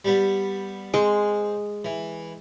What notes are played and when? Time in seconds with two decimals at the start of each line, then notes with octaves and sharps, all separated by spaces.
0.05 G3 B3
0.94 G#3 C4
1.85 E3